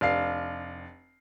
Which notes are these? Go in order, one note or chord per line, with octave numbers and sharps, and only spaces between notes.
F1 D4 F5 C7